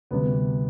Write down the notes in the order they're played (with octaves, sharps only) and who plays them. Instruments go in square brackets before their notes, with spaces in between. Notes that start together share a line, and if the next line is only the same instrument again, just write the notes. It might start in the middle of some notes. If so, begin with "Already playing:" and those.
[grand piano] D2 C3 G3 B3